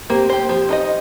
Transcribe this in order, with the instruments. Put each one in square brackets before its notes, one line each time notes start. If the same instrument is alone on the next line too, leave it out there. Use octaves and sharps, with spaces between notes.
[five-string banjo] A#3 [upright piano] G4 C5
[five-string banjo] G4 C5
[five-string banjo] F3 [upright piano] G4 C5
[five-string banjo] D#4 A#4 D#5